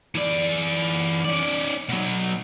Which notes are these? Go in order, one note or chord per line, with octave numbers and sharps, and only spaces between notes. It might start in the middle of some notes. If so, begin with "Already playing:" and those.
E3 D5
C#4 D5
B2 F#3